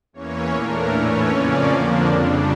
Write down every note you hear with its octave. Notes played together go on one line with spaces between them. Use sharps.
E2 E3 A#3 C#4 C#5
A#2 A3 D4 A#4
A2 E3 A3 C#4 C#5
F2 C#3 F3 A#3 C#4 D5
F2 D3 F3 A#3 D4
F2 C#3 G3 D4